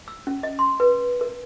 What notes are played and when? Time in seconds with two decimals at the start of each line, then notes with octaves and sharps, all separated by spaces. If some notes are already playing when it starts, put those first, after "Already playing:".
0.08 E6
0.27 C#4
0.43 D#5
0.59 C6
0.80 B4
1.21 A#4